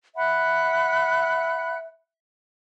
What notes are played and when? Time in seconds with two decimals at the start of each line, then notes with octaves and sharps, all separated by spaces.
0.15 E5 F#5 B5 F#6